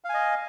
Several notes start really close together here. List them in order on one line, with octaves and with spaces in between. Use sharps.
F5 G#5 D#5